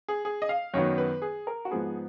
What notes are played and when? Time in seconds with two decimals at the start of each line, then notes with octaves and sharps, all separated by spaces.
0.08 G#4
0.25 G#4
0.42 D#5
0.49 F5
0.74 F#2 D#3 F#3 B3 C#5
0.98 B4
1.22 G#4
1.47 A#4
1.65 F#4
1.71 G#2 F3 B3 G#4